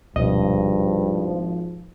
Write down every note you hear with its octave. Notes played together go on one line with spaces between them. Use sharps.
D#1 G#1 D2 G2 B2 F3 D#5